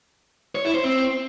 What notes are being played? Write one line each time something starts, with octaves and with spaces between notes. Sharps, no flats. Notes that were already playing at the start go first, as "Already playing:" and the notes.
C#5
E4
C5
C4